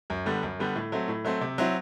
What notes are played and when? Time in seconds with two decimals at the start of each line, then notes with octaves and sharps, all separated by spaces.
0.10 F#2
0.26 D3 G3 B3
0.43 F#2
0.59 D3 G3 B3
0.76 A2
0.92 F#3 A3 C4
1.08 A2
1.25 F#3 A3 C4
1.41 C3
1.58 F#3 C4 E4